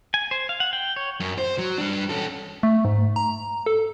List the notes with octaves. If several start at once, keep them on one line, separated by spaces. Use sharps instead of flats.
G#5
C5
F5
F#5
G5
C#5
F#2
C5
F#3
G3 D4
C#4 A4
A3
G#2
A#5
A4